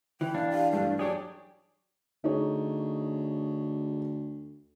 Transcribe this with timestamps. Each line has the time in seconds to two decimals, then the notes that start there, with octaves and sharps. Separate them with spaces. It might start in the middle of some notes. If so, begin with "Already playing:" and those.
0.21 E3 G5
0.35 D4 F5
0.51 G4 D5 F5
0.73 G2 G3 A3 F5
0.99 F#3 D4 G4 G#4 C#5 D5
2.24 D2 D#4 G#4 C#5